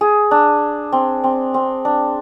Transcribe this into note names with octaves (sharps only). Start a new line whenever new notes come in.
G#4
D4
C4
C4
C4
D4